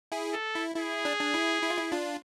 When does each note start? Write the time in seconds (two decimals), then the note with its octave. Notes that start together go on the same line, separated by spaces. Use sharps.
0.12 E4 G#4
0.34 A4
0.55 E4
0.76 E4 G#4
1.05 D4
1.21 D4
1.34 E4
1.63 E4
1.70 F4
1.78 E4
1.92 D4 F4